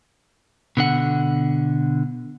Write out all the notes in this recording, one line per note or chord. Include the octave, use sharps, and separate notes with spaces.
B2 D3 F#5